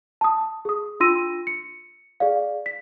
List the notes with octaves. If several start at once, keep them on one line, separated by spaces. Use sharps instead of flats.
A5 D#6
G#4 D#6
D4 F4 C6 E6 A#6 D#7
C#7
G#4 D5 F5
B6